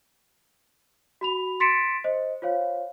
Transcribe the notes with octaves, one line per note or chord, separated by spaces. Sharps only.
F#4 B5 F7
C6 A6 B6 C#7 D7 E7
C5 D#5
F4 C5 C#5 F5